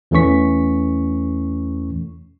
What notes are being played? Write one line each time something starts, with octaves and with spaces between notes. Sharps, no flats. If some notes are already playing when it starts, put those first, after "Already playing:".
E2 E3 A3 C#4 C#6 B6